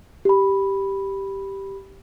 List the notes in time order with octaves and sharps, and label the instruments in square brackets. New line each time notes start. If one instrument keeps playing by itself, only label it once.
[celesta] G4 B5